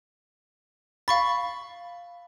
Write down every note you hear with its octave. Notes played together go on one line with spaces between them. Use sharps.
F5 B5 C#6 A6